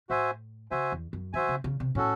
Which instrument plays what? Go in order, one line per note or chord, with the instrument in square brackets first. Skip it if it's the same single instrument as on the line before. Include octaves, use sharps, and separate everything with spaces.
[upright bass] A2 [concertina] F#4 C5 E5 G#5
[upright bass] C#3 [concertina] F#4 C5 E5 G#5
[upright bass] E2
F#2
[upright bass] D#3 [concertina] F#4 C5 E5 G#5
[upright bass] C#3
C#3
C3
[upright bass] A2 [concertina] C#4 F#4 A4